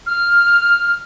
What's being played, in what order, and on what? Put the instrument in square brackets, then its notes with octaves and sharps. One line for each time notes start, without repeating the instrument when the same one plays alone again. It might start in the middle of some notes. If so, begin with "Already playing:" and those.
[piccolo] F6